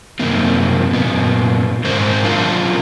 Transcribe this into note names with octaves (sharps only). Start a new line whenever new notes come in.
F#2 C3 D#3 A#3 C4
F#2 A#2 B3
G#2 D#3 A#4 C5
F#3 D4 F4 A#4 F5 A5